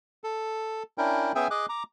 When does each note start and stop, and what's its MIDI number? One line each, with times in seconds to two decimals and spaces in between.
0.24 0.83 69
0.98 1.32 61
0.98 1.32 62
0.98 1.32 64
0.98 1.32 70
0.98 1.32 79
1.35 1.48 59
1.35 1.48 61
1.35 1.48 68
1.35 1.48 76
1.35 1.48 79
1.35 1.48 80
1.51 1.66 68
1.51 1.66 75
1.51 1.66 86
1.51 1.66 90
1.69 1.83 82
1.69 1.83 86